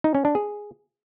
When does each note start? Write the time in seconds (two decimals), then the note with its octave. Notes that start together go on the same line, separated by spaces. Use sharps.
0.04 D#4
0.15 C#4
0.25 D4
0.35 G#4